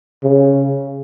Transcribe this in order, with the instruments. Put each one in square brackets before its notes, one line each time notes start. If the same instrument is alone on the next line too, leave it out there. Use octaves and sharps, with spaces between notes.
[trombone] C#3